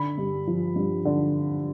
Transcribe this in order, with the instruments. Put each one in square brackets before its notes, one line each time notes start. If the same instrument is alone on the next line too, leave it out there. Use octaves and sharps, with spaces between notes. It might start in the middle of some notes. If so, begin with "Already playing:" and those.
Already playing: [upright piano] D3 B5
G2
F3
G2
D3